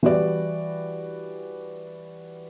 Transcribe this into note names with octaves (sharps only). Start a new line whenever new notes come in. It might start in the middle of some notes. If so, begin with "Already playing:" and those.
E3 G3 F#4 G4 D5